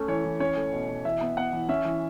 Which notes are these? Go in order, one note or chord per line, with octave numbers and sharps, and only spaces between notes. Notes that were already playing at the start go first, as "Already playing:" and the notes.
Already playing: A3 C#4
E3 C#5
E3
C#4 C#5
A3
B2
B2
E3 E5
B3
B3 F#5
E3
C#4 E5
E3